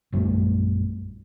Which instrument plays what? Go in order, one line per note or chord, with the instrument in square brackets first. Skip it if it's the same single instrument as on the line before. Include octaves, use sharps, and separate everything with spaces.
[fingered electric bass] A#1 F#2 G3 A3